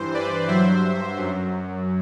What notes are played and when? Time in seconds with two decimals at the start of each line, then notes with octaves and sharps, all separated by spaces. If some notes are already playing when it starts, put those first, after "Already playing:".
Already playing: G2 E3 C5
0.14 B4 D5
0.48 G2 F#3 C5 E5
1.16 F#2 F#3